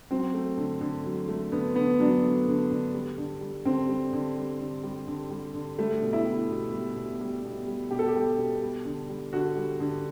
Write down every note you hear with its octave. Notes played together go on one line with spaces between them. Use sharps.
F#3 C4
A3
D3
D3
F#3
A3
D3 B3
D3 B3
F#3 D4
A3
D3
D3
G3
D3
G3
D3 C4
G3
D3
G3
D3
G3
D3
G3
D3
G3 A3
B2
E4
G3
B2
G3
B2
G3
B2
G3
B2 G4
A4
G4
G3
B2
G3
D3
G3
D3 F#4
G3
D3